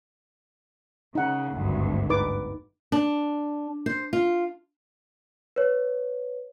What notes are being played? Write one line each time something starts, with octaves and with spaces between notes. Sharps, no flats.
C#3 D#4 F#5
G#1 D2 G2
D#4 B4 D6
D4
C5
F4
B4 C#5